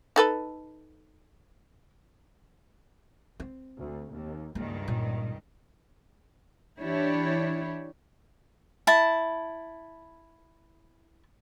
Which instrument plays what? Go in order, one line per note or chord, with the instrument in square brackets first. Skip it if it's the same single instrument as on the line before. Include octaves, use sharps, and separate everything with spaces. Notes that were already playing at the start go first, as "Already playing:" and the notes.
[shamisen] D#4 A4 B4
[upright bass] C4
[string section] D2
D#2
[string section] C#2 G2 D#3 [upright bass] A#3
[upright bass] A#2
[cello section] E3 D4 E4 G4 C#5
[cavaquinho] E4 A5